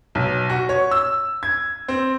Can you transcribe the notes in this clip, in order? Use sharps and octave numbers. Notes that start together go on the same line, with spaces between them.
B1
F#4
C#5
E6
G#6
C4